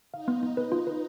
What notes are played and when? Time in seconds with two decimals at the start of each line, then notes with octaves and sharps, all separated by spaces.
0.13 D#4 F5
0.28 B3
0.43 B3
0.57 B4
0.72 F4
0.87 B4